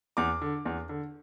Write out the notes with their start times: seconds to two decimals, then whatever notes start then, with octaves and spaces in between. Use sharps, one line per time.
0.17 E2 D6
0.41 D3
0.65 E2
0.89 D3